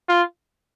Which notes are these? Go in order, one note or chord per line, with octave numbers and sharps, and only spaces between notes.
F4